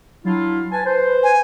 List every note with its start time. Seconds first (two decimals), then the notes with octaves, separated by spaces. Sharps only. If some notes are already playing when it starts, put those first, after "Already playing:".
0.25 F#3 D4 E4 F4
0.72 B4 G#5 A5
0.85 B4 C5
1.23 G#5